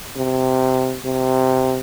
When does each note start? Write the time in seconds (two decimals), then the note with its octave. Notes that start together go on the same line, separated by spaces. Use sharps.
0.16 C3
1.05 C3